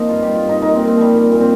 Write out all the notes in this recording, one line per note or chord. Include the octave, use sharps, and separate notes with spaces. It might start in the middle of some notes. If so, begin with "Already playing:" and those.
Already playing: F3 A#3 C4 D#4
G2 F4
G2 G4
F4
G2 D#4
A#2 D#4
A#2 C4
C4
F3 G3
A#2
A#2
C4